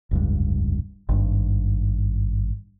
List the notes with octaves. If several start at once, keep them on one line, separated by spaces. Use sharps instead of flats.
F1 C#2 G2
G#1 G2